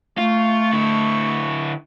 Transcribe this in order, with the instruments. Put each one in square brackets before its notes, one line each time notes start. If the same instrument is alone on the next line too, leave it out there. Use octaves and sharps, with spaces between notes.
[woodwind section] A3 [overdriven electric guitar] F4 [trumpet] C#6
[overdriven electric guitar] D3 E4